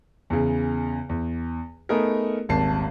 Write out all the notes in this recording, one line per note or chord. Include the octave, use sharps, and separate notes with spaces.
E2 C#3
E2
A3 B3 D#4 G#4 A#4
D#1 G#1 A5 C7